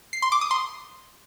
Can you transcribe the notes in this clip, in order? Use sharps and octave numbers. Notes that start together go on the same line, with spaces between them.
C7
C6
D6
D#6
C6